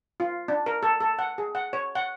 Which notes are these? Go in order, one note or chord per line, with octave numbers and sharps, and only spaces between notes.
F4
D4
A#4
A4
A4
F#5
G#4
F#5
C#5
F#5